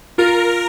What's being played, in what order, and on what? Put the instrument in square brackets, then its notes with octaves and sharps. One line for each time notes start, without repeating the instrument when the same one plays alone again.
[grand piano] F4 [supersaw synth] A#4